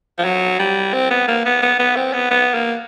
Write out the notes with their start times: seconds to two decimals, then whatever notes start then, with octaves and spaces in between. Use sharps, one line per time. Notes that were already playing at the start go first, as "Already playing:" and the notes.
0.19 F3
0.24 F#3
0.59 G3
0.93 C4
1.10 B3
1.28 A#3
1.45 B3
1.62 B3
1.79 B3
1.96 C4
2.13 B3
2.31 B3
2.54 A#3